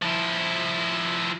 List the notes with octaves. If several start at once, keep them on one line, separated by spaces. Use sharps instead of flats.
F3 E4